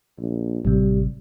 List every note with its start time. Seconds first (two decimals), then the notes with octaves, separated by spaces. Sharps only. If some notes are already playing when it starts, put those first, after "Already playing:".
0.19 A#1
0.65 A1 A2 C3 G3